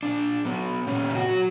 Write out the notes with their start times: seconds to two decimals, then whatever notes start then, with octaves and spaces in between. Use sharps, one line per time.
0.03 A#2 D4
0.45 F#3 B3
0.87 A#2 C#4
1.10 G4
1.15 F#4
1.29 F#3